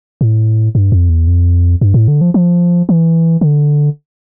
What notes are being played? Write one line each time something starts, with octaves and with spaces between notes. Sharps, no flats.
A2
G2
F2
E2
F2
G2
A2
D3
F3
F3
E3
D3